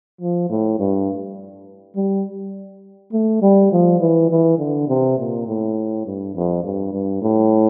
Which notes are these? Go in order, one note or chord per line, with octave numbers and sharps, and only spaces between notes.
F3
A2
G2
G3
A3
G3
F3
E3
E3
D3
C3
A#2
A2
G2
F2
G2
G2
A2